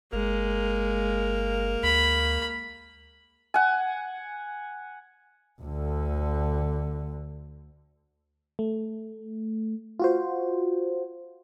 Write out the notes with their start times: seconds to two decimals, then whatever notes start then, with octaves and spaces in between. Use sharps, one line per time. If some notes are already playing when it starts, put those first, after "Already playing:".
0.13 G1 G#3 A#3
1.83 D2 B5
3.54 F#5 G#5
5.62 D2 D3
8.59 A3
10.00 F4 F#4 C5